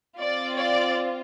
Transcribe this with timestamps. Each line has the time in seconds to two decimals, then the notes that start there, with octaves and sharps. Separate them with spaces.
0.19 C4 F4 D5
0.57 D5